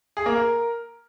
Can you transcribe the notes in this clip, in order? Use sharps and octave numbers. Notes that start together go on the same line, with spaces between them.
G#4
A#3
A#4